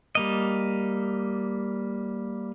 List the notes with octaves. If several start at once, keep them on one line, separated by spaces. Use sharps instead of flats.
G3 A#3 D#5